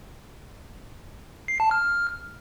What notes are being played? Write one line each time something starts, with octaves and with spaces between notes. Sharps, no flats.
C7
A5
F6